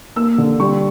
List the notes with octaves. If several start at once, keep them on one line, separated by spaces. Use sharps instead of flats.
A#3 E6
D3
G3 C#6